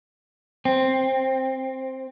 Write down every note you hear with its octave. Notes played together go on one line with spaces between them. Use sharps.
C4